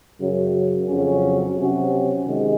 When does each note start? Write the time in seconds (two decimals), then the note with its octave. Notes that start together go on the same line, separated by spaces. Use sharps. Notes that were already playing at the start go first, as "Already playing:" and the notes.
0.20 F#2 C#3 F#3
0.88 F2 C#3 F#3 C#4
1.57 C3 F#3 C#4 F#4
2.25 C3 D#3 G#3